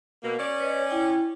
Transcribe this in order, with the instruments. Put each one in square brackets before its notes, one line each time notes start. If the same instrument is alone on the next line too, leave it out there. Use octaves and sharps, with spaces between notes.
[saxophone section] B2 A#3
C#4 D5
[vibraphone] B4 C#5 D#5
E4 G5